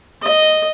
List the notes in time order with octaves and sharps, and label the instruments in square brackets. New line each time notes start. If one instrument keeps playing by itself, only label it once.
[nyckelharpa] D#5